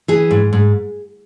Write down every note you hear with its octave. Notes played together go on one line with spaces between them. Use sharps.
E3 G#4
G#2
G#2